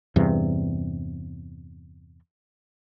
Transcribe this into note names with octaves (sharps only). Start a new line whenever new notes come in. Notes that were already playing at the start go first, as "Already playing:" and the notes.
E2 G2 C3